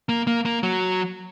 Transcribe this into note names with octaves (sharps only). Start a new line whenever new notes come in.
A#3
A#3
A#3
F#3